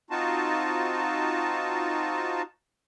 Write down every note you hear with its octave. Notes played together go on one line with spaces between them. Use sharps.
C4 D#4 F4 F#4 A5